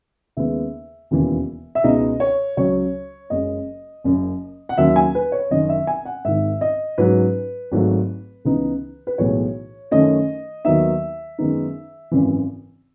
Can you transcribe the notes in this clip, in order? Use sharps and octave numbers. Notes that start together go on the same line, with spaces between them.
D#2 C#3 G#3 B3 E5
E1 D#2 C#3 E3
E5
C#2 B2 G#3 B3 D#4 D#5
C#5
C#2 C#3 F#3 C#4 C#5
F#1 F#2 C#3 G#3 C#4 D#5
F#1 F#2 C#3
F#5
D#2 C#3 F#3 E5
G#5
B4
C#5
F#1 F#2 D#3 D#5
E5
G#5
F#5
G#1 G#2 D#3 E5
D#5
G#2 F#3 C#4 B4
G#1 G#2 F#3 A3
C#2 C#3 E3 B3 D#4
B4
B1 A2 E3 G#3 B3 C#5
F#2 D#3 A3 C#4 D#5
D#2 D#3 F#3 B3 D#4 E5
F#2 D#3 G#3 B3 D#4
G#1 F#2 C#3 E3